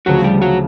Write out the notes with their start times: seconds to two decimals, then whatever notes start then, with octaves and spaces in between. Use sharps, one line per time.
0.06 D2 C#3 F3 F#3 F#4
0.24 G3 G4
0.42 F#3 F#4